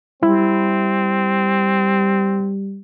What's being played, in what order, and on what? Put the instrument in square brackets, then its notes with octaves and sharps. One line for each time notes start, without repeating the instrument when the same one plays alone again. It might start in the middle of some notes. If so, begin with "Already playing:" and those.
[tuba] G3 [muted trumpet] C4 [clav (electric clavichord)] E4